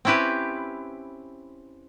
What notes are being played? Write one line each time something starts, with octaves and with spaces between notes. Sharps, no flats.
C4 C#4 E4 G4 B4